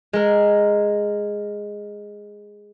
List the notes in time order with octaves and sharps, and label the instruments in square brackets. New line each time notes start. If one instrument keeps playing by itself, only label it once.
[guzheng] G#3 A#4